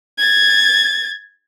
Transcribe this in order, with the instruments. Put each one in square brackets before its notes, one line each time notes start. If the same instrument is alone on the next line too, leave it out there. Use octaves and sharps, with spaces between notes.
[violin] G#6 A6